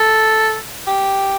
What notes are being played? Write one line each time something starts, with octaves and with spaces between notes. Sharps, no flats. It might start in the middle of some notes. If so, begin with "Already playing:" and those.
Already playing: A4
G4